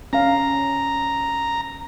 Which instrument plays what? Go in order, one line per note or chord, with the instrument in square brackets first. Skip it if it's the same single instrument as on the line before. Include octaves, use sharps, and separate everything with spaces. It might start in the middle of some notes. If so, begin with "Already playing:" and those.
[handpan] C#4 F5 [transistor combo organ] A#5